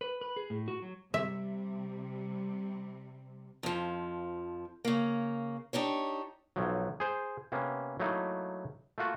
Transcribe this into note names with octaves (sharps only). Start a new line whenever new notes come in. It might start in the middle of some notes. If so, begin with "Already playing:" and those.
B4
B4
G#4
A2
F#4
F#3
C3 G3 E5
F2 F3
C#3 A#3
D4 D#4 G4 C#5
B1 F3 F#3
G#4 C5
C3 A#3 B3 C#4
F#3 A3 A#3 D#4 E4
A3 A#3 F4 F#4